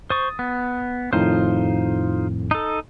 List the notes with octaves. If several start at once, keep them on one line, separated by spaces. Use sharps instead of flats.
C5 C#6 D#6 A6
B3
F2 A2 D#3 D#4 F4 C5
D#4 A4